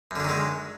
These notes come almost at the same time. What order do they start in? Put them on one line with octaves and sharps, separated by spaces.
F#2 D3 F#3 D#3 G#3